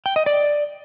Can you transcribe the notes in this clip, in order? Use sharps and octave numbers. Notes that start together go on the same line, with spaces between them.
G5
D#5
D5